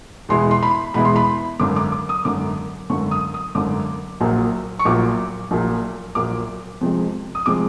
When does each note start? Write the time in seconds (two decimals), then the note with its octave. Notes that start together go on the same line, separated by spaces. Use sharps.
0.29 E2 B2 G#3 B3 E4 C6
0.51 C6
0.63 B5
0.94 E2 B2 G#3 B3 E4 B5
1.05 C6
1.16 B5
1.59 G#1 F#2 D3 D6
1.76 D6
1.92 D6
2.09 D#6
2.25 G#1 F#2 D3 D6
2.90 G#1 F#2 D3 C#6
3.11 D#6
3.34 D#6
3.55 G#1 F#2 D3 D6
4.20 A#1 A#2 F#3
4.79 C#6
4.85 A#1 A#2 F#3 D6
5.51 A#1 A#2 F#3
6.15 A#1 A#2 F#3 D6
6.81 F2 C3 F3 G#3
7.35 D#6
7.46 C3 F3 G#3 D6